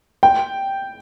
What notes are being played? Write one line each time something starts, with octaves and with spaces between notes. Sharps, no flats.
G5